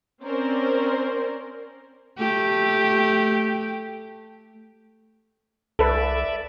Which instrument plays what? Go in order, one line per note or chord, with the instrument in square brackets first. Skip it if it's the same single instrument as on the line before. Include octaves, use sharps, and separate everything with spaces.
[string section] C4 C#4 A#4 C5 D5
[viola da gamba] A3 G4
[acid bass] C2 [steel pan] A4 B4 [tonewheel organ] D5 E5